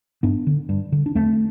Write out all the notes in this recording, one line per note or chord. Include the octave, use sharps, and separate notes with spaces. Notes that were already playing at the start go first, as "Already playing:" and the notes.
G2 B3 D4
D3
G2
D3
D4
E2 A3 C4